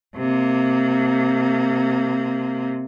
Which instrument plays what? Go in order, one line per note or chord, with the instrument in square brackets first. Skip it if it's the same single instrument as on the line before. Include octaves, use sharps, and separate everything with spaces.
[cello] C3 A#3